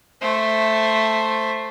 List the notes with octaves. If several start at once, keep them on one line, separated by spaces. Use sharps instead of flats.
A3 C5